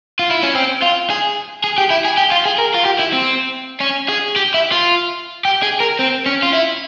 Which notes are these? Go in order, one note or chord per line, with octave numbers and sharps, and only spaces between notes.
F4
E4
C#4
C4
F4
G#4
G#4
G4
E4
G#4
G4
F4
G#4
A#4
F4
G4
E4
C4
C#4
G#4
G4
E4
F4
G4
G#4
A#4
C4
C#4
F4
E4